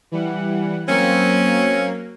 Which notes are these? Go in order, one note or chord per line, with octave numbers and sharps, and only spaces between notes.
E3 G3 F#5
F#3 A#3 C4 C#4